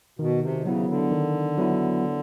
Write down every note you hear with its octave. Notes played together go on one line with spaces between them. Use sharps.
B2 D#3
C3
C#3 F#3 B3 E4
D3
D#3
F#3 B3 E4